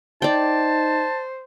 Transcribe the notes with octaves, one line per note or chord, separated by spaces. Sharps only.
D#4 C5 D5 G5 A5